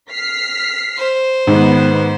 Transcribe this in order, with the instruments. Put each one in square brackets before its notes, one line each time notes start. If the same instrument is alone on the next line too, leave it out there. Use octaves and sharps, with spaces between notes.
[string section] F6 B6 C7
[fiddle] C5
[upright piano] G#2 [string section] D#3 B3